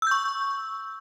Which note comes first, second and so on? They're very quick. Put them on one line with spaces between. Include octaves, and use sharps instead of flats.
E6 G6 C#6